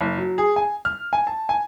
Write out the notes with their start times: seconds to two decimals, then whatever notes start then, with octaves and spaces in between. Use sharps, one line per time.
0.01 F#1
0.18 F#3
0.38 G#4
0.56 G#5
0.85 F6
1.13 G#5
1.27 A5
1.49 G#5